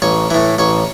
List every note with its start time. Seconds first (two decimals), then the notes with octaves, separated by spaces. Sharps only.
0.02 A1 C#5
0.30 A2 E3
0.59 A1 C#5